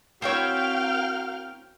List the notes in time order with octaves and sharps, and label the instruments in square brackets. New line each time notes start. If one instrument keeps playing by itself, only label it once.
[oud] C4 E4 C#5 [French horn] F#4 [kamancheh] A#4 F5 [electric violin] G5 F6